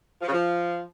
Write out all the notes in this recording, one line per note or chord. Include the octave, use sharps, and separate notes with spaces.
F3
C#3
F3